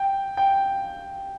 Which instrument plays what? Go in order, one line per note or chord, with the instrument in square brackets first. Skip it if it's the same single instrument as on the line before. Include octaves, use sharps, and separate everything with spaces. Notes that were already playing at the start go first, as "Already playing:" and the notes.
Already playing: [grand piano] G5
G5